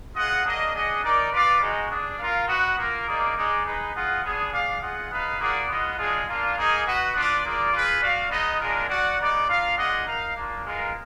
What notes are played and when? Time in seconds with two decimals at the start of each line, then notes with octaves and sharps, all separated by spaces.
0.15 F4 G#4 D#5 F#5
0.44 A#3 D4 G#4 D#5
0.73 D4 G#4 D#5 F#5
1.02 D#4 A#4 D5
1.32 F4 B4 D5 F5
1.60 G#3 D#4 F#4
1.90 D4 G#4 D5
2.19 F4 A#4 F5
2.48 F#4 B4 D#5 F#5
2.77 A#3 F4 A#4
3.06 A#3 D#4 G#4 D5
3.35 G#3 D#4 G#4 D5
3.64 D#4 G#4 B4 D#5
3.93 F4 G#4 D#5 F#5
4.22 B3 D4 G#4
4.51 D4 G#4 D5 F5
4.81 F4 G#4 D#5 F#5
5.10 B3 D#4 G#4 B4 F5
5.39 A#3 F4 G#4 D5 F#5
5.68 B3 F4 G#4 D#5 F#5
5.97 G#3 D4 F4 G#4
6.26 A#3 D4 F4
6.56 A#3 D#4 G#4
6.85 F#4 B4 D#5 F#5
7.14 D4 F4 B4 D5
7.43 A#3 F4 G#4 D5
7.72 F4 G#4 B4
8.01 F#4 D5 F5
8.30 B3 D#4 G#4 D#5
8.59 G#3 D4 F4 A#4
8.88 F#4 D5 F#5
9.18 B3 D#4 G#4 D5
9.47 D4 F4 A#4 F5
9.77 D4 F4 G#4 D#5 F#5
10.05 D#4 A#4 F5
10.35 A#3 D4 F4
10.63 G#3 B3 F4 A#4 F5